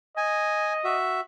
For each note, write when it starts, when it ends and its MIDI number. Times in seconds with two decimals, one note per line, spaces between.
0.17 0.98 75
0.17 0.73 80
0.84 1.21 66
0.84 1.21 76